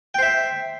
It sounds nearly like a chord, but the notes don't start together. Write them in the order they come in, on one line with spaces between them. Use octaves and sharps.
G5 C5 E5